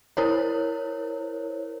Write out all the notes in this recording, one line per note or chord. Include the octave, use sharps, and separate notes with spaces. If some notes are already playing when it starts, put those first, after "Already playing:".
E4 A#4 C5 C#5